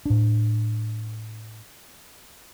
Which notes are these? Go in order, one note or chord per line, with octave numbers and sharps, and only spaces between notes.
A2 D4